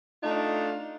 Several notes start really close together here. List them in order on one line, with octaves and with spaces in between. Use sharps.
F4 D#4 A3 D4